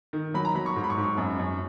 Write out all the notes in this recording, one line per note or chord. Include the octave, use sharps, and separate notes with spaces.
D#3
F#3 B5
A#5
F#3 B5
C#6
G#2
B5
C#6
G#2
C#6
F#2
F#2